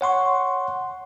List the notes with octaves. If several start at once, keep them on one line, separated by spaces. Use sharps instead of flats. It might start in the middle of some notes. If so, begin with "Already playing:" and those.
C#5 F#5 C6 C#6